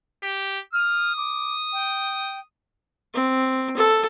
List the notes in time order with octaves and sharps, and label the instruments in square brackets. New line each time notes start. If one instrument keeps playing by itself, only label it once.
[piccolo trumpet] G4
[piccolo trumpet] D#6 [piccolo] F6
[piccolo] D6
G5
[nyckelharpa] C4
A4